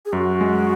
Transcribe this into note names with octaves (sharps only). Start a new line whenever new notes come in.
G#4
F#2 F#4
G#3